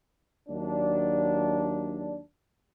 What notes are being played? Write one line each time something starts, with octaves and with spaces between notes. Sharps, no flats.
D#2 F#3 D4